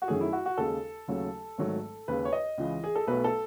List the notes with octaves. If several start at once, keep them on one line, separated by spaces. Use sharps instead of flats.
F#4
F#2 D#3 F#3 A3 G#4
E4
F#4
F#4
D#2 C#3 G#3 A4
D#2 C#3 F#3 A3
G#1 G#2 D#3 F#3 A3
D#2 C#3 G#3 B4
C#5
D#5
C#2 C#3 E3
G#4
A4
B1 B2 F#3 A3 B4
A4